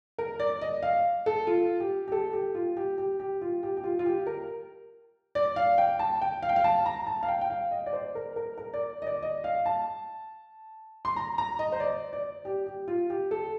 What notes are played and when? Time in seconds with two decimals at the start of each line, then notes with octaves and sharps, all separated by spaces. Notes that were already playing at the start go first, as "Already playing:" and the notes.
0.18 A#4
0.40 D5
0.61 D#5
0.83 F5
1.26 A4
1.47 F4
1.80 G4
2.08 G4
2.12 A4
2.33 G4
2.55 F4
2.77 G4
2.98 G4
3.20 G4
3.41 F4
3.63 G4
3.77 G4
3.84 F4
3.99 F4
4.06 G4
4.27 A#4
5.35 D5
5.56 F5
5.78 G5
5.99 A5
6.21 G5
6.43 F5
6.49 G5
6.56 F5
6.64 A5
6.86 A#5
7.07 A5
7.23 F5
7.28 G5
7.41 G5
7.50 F5
7.71 D#5
7.86 D5
7.93 C5
8.15 A#4
8.36 A#4
8.58 A#4
8.74 D5
9.02 D#5
9.07 D5
9.22 D#5
9.44 F5
9.66 A5
11.05 C6
11.16 A#5
11.38 A#5
11.59 D#5
11.72 C5
11.80 D5
12.13 D5
12.45 G4
12.66 G4
12.88 F4
13.10 G4
13.31 A4